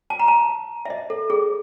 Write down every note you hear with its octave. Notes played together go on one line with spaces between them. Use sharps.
A5
A#5
A5
E5
D#5
A4
G#4